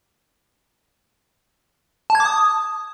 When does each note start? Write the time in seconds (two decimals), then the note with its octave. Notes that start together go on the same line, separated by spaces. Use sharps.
2.10 A5
2.15 G#6
2.20 D6
2.25 D#6